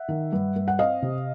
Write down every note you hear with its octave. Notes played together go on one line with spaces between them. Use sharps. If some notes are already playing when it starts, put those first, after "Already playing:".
Already playing: E5 F#5
D#3
G2
G2
F#5
C4 D#5 F5
C3